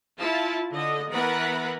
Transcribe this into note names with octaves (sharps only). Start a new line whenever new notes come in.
E4 F4 A5
D3 D#5
E3 B3 A#4 B4 F#5 B5